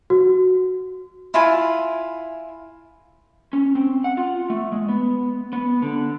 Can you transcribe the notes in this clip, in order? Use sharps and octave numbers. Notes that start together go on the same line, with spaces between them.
F#4
E4 F4 G#5
C#4
C4
F#5
F4
A3
G#3
B3
B3
D3